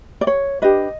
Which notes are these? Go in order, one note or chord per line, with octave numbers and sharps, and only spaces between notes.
D5
C#5
D4 G4 B4 D#5